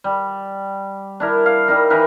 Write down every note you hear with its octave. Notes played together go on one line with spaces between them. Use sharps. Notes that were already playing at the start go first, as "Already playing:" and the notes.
G3
D4 E4 A#4
F5
G3 D#4 A#4
E3 D#4 A#4 B4